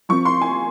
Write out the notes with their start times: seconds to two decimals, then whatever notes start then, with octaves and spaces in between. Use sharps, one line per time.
0.09 F3 C4 C#6
0.25 C6
0.41 G#5